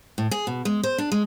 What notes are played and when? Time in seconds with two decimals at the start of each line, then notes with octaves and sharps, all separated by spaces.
0.18 A2
0.31 G#4
0.47 B2
0.65 G#3
0.83 C5
0.98 D4
1.12 G#3